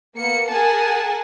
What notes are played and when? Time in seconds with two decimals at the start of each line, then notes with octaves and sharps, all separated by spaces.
0.17 A#3 B3 C#7
0.51 G#4 A#4 F#5 G#5 A5